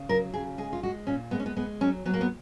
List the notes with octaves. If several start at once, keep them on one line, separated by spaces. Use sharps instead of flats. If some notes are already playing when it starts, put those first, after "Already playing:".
Already playing: C#3
F#3 A#4
C#3 G#4
G#3 G#4
F4
G#3 F#4
A#2 C#4
G#3 B3
C#4
B3
G#3 B3
F#3 C#4
F#3 B3
A#3
B3